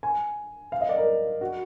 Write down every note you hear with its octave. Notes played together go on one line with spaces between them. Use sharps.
G#5
F5
D#5
D5
A#4
F#4